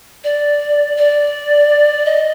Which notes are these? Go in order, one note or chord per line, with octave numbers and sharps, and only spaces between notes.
D5
D5
D#5